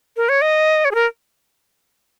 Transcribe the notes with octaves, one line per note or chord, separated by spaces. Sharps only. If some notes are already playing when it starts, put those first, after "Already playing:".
A#4
C#5
D#5
C#5
G#4
A#4